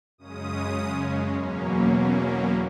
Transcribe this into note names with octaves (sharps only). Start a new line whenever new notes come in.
F#2 C#3 G#3 C#4 D#6
E2 B2 F#3 A#3 C#4